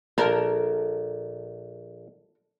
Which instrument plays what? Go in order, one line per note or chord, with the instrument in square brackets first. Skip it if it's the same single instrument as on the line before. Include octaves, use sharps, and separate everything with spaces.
[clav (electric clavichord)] A#1 [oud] A4 A#4